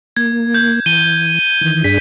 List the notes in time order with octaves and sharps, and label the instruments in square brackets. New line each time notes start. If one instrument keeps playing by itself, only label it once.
[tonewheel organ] A#3 [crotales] G#6
[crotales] G6
[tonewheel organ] E3 [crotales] D#7 G7
[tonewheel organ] D#3 E3
[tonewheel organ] G2 D4 G#4 [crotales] B6